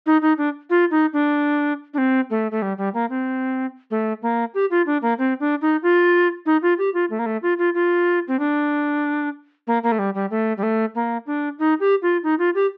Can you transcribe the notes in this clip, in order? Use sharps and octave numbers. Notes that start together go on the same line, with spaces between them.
D#4
D#4
D4
F4
D#4
D4
D4
C4
A3
A3
G3
G3
A#3
C4
A3
A#3
G4
F4
D4
A#3
C4
D4
D#4
F4
D#4
F4
G4
F4
A3
A#3
A3
F4
F4
F4
C4
D4
A#3
A#3
A3
G3
G3
A3
G3
A3
A#3
D4
D#4
G4
F4
D#4
F4
G4